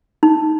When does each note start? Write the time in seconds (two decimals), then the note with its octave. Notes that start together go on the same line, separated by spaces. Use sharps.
0.23 D#4